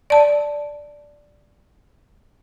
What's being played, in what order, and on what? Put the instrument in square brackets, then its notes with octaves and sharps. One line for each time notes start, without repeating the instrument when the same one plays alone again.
[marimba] D5 A5